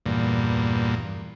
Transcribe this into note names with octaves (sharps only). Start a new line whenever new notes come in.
E2 G2 A#2